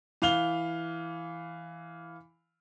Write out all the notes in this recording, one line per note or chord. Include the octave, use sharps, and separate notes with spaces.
E3 F5 F7 G7